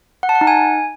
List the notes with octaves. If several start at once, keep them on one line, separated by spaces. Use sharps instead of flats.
F#5
A5
F#5
D#4
G#5